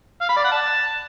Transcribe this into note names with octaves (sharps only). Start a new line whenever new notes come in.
F5
B5
D5
F#5
A5